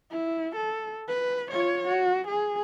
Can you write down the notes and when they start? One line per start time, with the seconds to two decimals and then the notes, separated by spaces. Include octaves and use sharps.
0.10 E4
0.56 A4
1.08 B4
1.51 F4 C#5
1.88 F#4
2.28 G#4